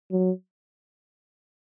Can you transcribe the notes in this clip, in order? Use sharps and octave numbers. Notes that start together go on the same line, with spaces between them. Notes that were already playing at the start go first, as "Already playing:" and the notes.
F#3